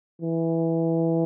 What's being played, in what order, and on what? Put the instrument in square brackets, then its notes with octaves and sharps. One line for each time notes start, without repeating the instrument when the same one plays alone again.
[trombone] E3